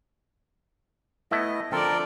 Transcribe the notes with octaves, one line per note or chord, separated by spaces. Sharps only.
A3 B3 E4 D#5
D3 F3 C4 A4 A#4 D5 A5